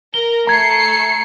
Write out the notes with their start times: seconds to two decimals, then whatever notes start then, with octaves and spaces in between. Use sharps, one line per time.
0.14 A#4 G7
0.47 A3 A#5 G#6 C7 C#7